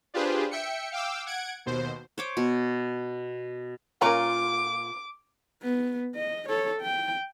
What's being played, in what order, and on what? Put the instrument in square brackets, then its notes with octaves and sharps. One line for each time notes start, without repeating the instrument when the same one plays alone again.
[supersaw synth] D4 F4 G4 G#4 B4 C5
E5 G5 C#7
F5 G5 D6 E6
F#5 G#6 D7
D#2 B2 C5
[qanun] C5 C#5 D6
B2
[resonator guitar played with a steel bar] A#2 F4 A#5 [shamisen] A#3 C#4 [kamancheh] D6
[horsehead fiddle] B3
D#5
A4 C#5
G5